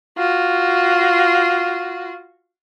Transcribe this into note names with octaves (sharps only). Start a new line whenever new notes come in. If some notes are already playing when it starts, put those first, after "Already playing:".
F4 F#4